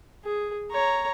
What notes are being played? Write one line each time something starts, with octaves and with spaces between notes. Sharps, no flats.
G#4
C#5 A#5